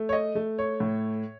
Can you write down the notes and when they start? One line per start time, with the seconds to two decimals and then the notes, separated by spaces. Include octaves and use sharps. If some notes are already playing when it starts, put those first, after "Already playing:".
Already playing: A3
0.09 C#5
0.13 D#5
0.35 A3
0.58 C#5
0.80 A2